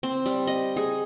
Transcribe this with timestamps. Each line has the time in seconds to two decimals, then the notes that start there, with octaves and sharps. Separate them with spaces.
0.03 C4
0.26 G3
0.47 D#5
0.77 G#4